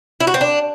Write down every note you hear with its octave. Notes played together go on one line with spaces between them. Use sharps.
E4
F#4
C4
D4